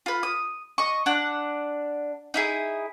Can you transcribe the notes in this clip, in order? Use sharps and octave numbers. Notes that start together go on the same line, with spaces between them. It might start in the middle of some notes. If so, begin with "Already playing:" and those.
F4 B4
D#6
D#5 C#6
D4 F#5
D#4 E4 G#4